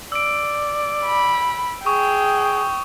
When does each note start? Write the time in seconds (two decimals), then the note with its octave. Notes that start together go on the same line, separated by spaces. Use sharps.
0.12 D5 E6 D7
1.05 B5
1.86 G#4 G5 C#6 D#6